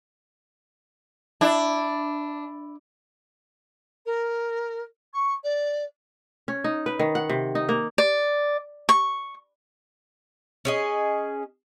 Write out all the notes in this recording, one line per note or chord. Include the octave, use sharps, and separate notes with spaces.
D4 E4
A#4
C#6
D5
C#4
D#4
B4
D#3
F#5
C3
D#4
A#3
D5
C#6
C#4 G#4 D#5